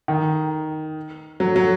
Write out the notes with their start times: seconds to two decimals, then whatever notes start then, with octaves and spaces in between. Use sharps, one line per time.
0.08 D#3
1.40 F#3
1.56 F#3